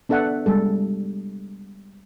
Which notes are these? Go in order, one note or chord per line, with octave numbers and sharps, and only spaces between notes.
B3 D4 A4 E5 F#5
G3 G#3 A4